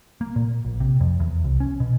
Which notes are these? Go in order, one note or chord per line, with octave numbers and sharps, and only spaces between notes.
A#3
A#2
A#1
C3
F2
E2
C2
C#4
B2